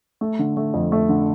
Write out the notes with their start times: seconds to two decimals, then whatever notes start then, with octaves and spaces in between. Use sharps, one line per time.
0.21 A3
0.39 D3
0.57 A3
0.74 F2
0.92 A3
1.09 D3